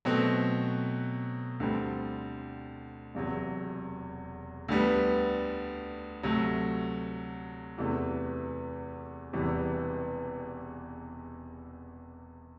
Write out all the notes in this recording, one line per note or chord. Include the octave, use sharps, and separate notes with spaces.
B2 F#3 A3 C4
D2 D3 G3 C4
E1 E2 C3 F#3
D2 D3 G3 B3
D2 C3 F#3 A3
E2 C3 E3 A3
E1 E2 C3 E3 G3